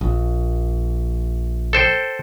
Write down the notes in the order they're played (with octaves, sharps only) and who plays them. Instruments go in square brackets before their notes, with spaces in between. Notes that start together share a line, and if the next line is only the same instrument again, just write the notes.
[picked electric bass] A#1
[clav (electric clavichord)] A4 C5 G5